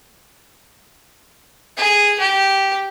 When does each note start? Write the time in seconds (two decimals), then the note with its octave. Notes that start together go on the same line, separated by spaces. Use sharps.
1.77 G#4
2.19 G4